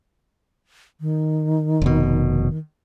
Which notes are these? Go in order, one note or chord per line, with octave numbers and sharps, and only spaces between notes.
D#3
F1 B2